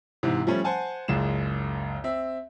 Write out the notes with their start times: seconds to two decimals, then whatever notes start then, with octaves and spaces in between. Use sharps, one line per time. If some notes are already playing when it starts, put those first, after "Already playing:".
0.23 G#2 C3 E3
0.47 F3 G3 A3 C#4
0.64 C5 F#5 G#5 A5
1.08 F#1 C#2 G#3 E7
2.04 C4 E5